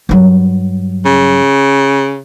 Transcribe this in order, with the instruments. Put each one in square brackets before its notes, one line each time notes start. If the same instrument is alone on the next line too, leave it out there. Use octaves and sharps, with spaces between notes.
[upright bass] G2 F#3
[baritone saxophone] C#3